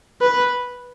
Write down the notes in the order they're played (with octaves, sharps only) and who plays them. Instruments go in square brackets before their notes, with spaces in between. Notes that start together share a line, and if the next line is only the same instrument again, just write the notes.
[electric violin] B4